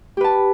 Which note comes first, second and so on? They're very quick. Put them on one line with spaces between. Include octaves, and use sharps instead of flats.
G4 B4 A5